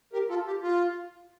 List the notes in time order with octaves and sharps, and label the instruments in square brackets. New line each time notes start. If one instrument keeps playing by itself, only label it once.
[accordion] G4 A#4
F4 A4
G4
F4